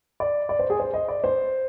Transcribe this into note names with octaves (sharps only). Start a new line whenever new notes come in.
D5
D5
C5
G#4
C5
D#5
D5
C5